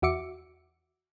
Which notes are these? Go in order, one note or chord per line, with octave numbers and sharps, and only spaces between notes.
E2 F#4 E5 D6 C#7